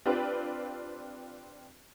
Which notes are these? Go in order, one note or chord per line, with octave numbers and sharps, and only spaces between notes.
C4 D4 F4 G4 B4